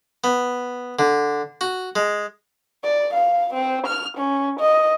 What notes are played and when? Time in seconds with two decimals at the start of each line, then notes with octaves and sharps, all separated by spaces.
0.24 B3
0.99 D3
1.61 F#4
1.96 G#3
2.83 D5
3.14 F5
3.54 C4
3.87 F6
4.17 C#4
4.60 D#5